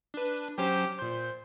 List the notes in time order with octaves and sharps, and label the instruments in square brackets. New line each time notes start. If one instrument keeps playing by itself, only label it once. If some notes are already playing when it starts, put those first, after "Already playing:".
[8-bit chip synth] D4 B4
[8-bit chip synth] F#3 C#4 C5 [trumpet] G4
[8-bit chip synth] A#2 G6 [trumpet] C5